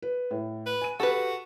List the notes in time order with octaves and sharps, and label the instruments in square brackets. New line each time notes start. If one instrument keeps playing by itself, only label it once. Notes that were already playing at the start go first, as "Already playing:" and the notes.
[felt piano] B4
A2
[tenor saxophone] B4
[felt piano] G#5 D#7
[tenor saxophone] F#4 [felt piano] G4 E7 [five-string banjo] A4 B4